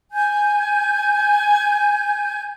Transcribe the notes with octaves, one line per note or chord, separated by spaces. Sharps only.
G#5 G6